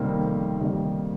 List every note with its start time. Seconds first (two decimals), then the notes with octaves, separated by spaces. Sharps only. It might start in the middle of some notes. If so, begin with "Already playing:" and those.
Already playing: F2 C3 D#3 G3 A#3
0.19 F2
0.60 C3 D#3 G3 A#3